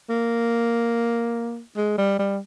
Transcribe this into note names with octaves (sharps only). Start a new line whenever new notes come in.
A#3
G#3
G3
G3